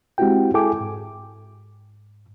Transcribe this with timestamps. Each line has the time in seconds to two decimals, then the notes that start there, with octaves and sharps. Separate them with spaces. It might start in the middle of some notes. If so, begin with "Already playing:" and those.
0.18 G#3 C4 E4 F#4 G4 G5
0.54 E4 G#4 A4 G5 G#5 D6
0.80 G#2